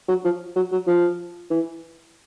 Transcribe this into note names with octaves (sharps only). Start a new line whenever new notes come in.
F#3
F3
F#3
F#3
F3
E3